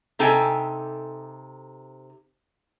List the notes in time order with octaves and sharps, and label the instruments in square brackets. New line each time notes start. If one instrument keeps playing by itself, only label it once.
[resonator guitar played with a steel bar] C3 D#4 A4 G5 G#5